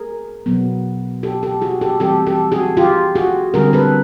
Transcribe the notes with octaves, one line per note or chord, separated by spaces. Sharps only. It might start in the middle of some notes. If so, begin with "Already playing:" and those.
Already playing: G#4 A#4
B2 F#3 B3
G4 A4
G4 A4
F#4 G#4
G4 A4
E3 G3 C4 G4 A4
G4 A4
F#4 G#4
F4 G4
F#4 G#4
D3 G3 C4 G#4 A#4
A4 B4